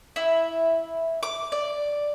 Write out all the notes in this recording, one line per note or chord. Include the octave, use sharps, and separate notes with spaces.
E4
D6
D5